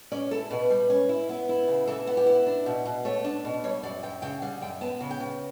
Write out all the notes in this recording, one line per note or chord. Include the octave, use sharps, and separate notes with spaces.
C#4 D5
E4 A4
B2 B4
G3
C#4
E4
B3
E4
C#3
E3 A4
B3
G4
E4
D4
B2
B2
A3 C#5
D4
B2
G3 C#5
F#2 D5
F#2 G5
C#3 G5
G3 F#5
F#2 G5
B3 A5
C#3
G5
C#3